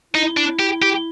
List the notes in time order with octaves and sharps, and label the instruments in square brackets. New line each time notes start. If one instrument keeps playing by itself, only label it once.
[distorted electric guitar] D#4 [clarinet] E4
[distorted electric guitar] D4
G4
G4